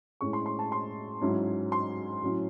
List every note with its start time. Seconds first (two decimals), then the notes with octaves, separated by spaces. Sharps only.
0.21 A2 G#3 C#4 E4 C#6
0.33 C6
0.46 C6
0.59 A5
0.72 C6
1.21 G#2 F#3 C#4 E4
1.72 C6
2.22 A2 F#3 C#4 E4